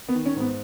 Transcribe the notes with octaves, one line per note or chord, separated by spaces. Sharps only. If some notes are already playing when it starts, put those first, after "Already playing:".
B3
D#3
C#4
G#2 B3